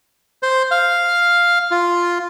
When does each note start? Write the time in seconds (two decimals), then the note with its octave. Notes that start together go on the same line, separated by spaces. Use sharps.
0.43 C5
0.71 F5
1.71 F4